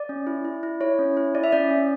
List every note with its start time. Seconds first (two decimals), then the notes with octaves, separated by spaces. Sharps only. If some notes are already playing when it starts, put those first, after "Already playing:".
Already playing: D5
0.09 C#4
0.27 E4
0.45 E4
0.63 E4
0.81 E4 C#5
0.99 C#4
1.17 E4
1.35 E4 D5
1.44 E5
1.52 C#4 D5
1.70 C#4